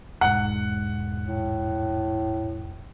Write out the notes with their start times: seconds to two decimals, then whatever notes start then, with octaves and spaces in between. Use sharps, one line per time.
0.21 E1 G#2 F#5
1.21 A2